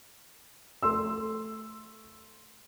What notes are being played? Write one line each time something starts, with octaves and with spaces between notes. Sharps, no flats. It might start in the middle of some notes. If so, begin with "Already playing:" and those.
A3 C6 E6